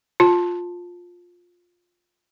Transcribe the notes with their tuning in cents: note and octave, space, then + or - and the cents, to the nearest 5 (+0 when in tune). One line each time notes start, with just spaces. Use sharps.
F4 +15 A5 +0